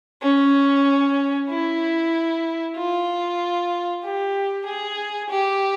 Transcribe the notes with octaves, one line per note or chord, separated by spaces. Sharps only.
C#4
E4
F4
G4
G#4
G4